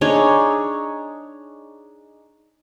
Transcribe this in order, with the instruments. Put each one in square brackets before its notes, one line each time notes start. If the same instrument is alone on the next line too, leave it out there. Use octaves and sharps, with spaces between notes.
[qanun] D4 D#4 G#4 C#5